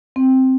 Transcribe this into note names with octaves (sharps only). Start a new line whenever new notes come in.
C4